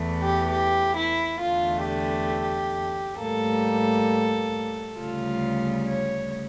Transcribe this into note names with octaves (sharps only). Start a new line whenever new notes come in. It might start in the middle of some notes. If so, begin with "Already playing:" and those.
Already playing: E2 E3 A3
G4
G4
E4
E2 D3 A3 F4
G4
A2 G3 A#3 A4
D2 C#3 G3 F4
C#5